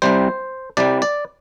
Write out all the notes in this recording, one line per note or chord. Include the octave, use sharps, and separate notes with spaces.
C2 C3 G3 C5
C2 C3 G3 D5
D5